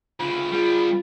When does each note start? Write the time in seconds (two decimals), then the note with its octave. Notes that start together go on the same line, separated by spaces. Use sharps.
0.20 D2 C#3 F4 B5
0.52 G3 B3 F4 G#4